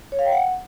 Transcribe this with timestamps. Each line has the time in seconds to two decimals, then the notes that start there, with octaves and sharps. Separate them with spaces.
0.12 C#5
0.19 F5
0.26 G5
0.32 F#5